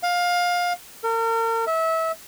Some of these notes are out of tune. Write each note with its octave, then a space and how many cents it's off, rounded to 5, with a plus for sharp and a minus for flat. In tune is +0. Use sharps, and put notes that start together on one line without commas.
F5 +20
A#4 -40
E5 -25